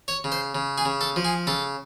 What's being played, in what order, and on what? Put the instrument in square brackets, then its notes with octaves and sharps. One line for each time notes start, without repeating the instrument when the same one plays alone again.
[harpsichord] C#5
C#3
C5
C#3
G#4
C#3
A4
F3
G#4
C#3 A4